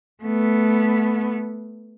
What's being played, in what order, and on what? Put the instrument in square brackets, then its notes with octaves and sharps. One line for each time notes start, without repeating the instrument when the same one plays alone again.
[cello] A3 B3